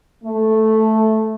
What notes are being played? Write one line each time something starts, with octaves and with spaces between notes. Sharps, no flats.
A3